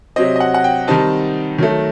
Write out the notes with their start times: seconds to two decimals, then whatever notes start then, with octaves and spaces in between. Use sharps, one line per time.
0.16 C3 F#3 C4 D#5
0.36 D#5
0.40 F#5
0.54 F#5
0.64 G5
0.88 D#3 G3 C4 D#4 A5
1.58 D#3 F#3 A3